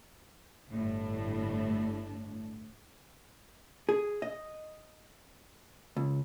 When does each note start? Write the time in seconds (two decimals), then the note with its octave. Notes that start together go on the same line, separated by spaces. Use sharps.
0.72 G1 A2 D4
3.89 G#4
4.22 D#5
5.97 C#2